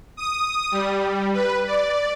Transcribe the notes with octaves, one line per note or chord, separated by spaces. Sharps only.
D#6
G3
B4
D5